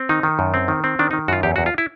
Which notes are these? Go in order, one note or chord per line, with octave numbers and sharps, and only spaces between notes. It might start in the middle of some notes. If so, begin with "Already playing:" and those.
Already playing: C4
D#3 D#4
D#3
F#2
C4
D#3
C4
D#3 D4
D#3 D#4
F#2 F4 F#4
E2 G4
E2 F#4
F4
E4